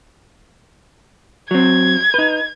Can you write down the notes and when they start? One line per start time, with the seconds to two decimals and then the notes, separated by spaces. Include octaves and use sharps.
1.51 F#3 C4 G#6
2.14 D#4 B4